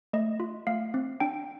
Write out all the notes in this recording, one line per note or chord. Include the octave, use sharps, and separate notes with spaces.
A3 D#5
F4
A3 F5
C4
D4 G5